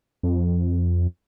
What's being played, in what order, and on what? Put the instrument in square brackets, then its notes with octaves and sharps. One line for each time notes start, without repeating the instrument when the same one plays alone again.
[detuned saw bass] F2